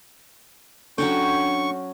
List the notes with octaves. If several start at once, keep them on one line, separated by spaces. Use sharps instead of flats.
F#3 C#4 D4 A4 G5 C#6